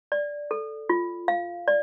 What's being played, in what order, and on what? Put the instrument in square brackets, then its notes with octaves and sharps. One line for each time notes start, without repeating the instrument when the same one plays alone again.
[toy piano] D5
A4
F4
F5
D5